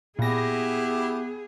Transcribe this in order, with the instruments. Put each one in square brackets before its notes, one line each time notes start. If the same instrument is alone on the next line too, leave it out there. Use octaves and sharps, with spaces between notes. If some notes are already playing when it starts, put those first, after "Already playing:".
[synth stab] A#2 A#6 [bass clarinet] B3 [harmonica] E4 G4 [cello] G#4